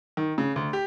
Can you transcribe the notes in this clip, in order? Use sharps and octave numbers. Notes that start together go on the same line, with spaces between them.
D#3
C#3
D2
G4